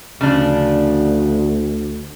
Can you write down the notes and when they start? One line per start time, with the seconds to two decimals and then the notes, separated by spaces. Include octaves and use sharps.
0.21 D2 C#3 F3 D4